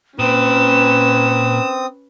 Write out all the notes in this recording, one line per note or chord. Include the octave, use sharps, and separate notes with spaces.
A#2 C4 C#4 B4 D#6 E7